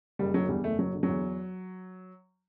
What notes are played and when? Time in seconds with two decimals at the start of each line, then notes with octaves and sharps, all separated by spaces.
0.19 F#1 G3
0.34 D3 F#3
0.49 E2 G3
0.63 F#1 A3
0.78 F#1 F#3
0.94 D3
1.03 F#3
1.09 E2